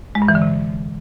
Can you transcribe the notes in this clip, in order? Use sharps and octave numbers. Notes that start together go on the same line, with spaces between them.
G#3
G2
E3
D3
C3